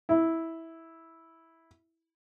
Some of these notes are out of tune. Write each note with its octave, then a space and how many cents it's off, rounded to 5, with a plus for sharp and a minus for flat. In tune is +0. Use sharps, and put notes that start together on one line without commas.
E4 -10